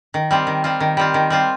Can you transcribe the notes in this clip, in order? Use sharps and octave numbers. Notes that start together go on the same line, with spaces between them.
D#3
G3 C4 F4
D#3
G3 C4 F4
D#3
G3 C4 F4
D#3
G3 C4 F4